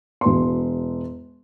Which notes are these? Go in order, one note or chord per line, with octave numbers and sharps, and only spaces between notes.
E1 C6